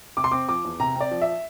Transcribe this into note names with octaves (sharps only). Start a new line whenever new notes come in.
C3 D6
C6
C4 D6
F3 D6
E2
C3 A#5
C4 D5
F3
E5